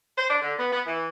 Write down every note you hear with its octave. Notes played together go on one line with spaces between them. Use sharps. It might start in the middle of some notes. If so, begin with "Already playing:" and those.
C5
D4
D3
B3
B3
E3